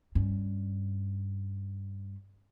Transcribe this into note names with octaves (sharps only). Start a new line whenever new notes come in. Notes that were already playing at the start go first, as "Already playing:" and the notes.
G2 C#4